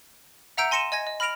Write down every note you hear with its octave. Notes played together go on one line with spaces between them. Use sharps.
E5 F#5 A#5 E6 G6 D7
G#5 C6 A#6 C#7 D#7 E7
D#5 G#5 G#6 A#6
D#5
B5 F6 A#6 D7 F7 F#7